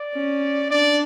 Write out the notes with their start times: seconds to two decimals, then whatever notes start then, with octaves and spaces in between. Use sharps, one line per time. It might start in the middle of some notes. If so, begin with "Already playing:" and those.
Already playing: D5
0.14 C#4
0.71 D4 D5